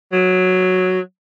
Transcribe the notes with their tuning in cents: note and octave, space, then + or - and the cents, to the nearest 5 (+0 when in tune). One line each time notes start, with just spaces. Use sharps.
F#3 -5